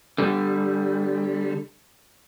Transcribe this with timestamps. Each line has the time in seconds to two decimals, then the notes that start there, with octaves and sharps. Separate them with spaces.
0.18 D3 G3